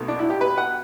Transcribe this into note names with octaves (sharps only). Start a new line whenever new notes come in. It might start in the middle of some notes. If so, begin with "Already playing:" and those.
Already playing: B1 B2 A3
D4
E4
G4
B4
F#5